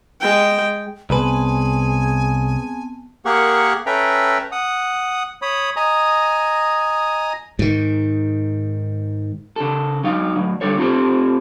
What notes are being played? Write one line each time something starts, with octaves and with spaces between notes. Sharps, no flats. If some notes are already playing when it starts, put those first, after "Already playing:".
G#3 G5
C2 B3 C4 G#4 B4 G#5 A5
A#3 G4 G#4 A#4 F#5 C#6
C#4 A4 B4 E5 G5 A#5
F#5 D#6
C#5 B5 D#6
D#5 G#5 A#5 D#6
G#2 D#3
C#3 A4
F#3 D#4 F5
A2 F#3
D3 G3 A4 C#5
C4 F4 G4 A4 C5